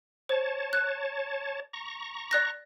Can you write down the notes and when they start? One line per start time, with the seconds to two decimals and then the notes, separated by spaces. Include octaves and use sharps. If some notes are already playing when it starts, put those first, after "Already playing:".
0.29 C5 C#5 A5
0.73 F#6
1.73 A#5 C#6
2.31 D5 F#6 A#6